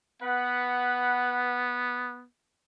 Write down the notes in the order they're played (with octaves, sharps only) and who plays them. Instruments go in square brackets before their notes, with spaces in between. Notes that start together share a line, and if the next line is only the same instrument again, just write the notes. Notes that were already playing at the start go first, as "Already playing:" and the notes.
[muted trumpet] B3 [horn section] B4 F#5